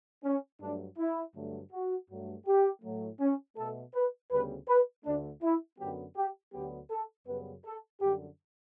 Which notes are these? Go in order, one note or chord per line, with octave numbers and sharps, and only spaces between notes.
C#4
G2 F#3 A3 D4
E4
G2 D3 F#3 A3
F#4
G2 F#3 A3
G4
A2 F#3 A3
C#4
B2 A3 A4
B4
D2 C#3 G3 B3 B4
B4
D2 D3 A3 D4
E4
F#2 D3 F#3 B3 G4
G4
D2 D3 F#3 B3 G4
A4
F#2 C#3 G3 B3 B4
A4
F#2 D3 G3 G4